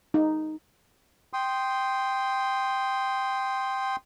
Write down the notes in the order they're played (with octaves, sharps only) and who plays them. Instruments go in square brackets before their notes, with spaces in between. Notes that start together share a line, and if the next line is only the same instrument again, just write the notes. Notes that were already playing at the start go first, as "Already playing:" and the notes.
[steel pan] D#4
[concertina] G5 C6 D#6